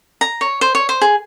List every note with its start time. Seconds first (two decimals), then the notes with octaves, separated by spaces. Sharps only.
0.21 A#5
0.41 C#5
0.61 C5
0.75 C#5
0.89 C5
1.01 G#4